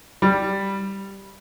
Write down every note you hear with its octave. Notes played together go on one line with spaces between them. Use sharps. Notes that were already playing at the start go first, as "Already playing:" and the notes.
G3